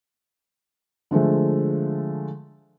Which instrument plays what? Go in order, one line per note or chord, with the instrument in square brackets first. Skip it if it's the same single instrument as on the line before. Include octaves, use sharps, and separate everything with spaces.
[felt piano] D3 F3 G#3 A3